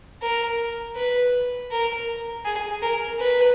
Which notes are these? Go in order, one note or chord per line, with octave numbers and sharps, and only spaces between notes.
A#4
B4
A#4
G#4
A#4
B4